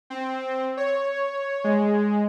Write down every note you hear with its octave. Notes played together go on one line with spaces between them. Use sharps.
C4
C#5
G#3